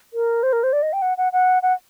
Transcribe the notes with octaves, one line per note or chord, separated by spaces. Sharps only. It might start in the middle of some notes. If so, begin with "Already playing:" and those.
A#4
C5
A#4
C5
D5
D#5
G5
F#5
F#5
F#5
F#5